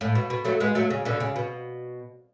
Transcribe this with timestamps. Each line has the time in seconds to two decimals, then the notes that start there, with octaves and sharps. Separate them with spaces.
0.01 A2
0.15 B2
0.30 B2
0.45 F#3 A3
0.60 G#3 B3
0.75 F#3 A3
0.90 C#3
1.05 B2 D3
1.20 C#3
1.36 B2